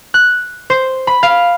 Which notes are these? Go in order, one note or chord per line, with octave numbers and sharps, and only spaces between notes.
F#6
C5
B5
F5